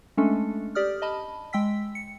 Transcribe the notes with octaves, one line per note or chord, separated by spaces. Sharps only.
G#3 A3 C#4 D4 A4
G4 D5 D#6 F6
D#5 A5 B5
G#3 G5 E6 B6
C#7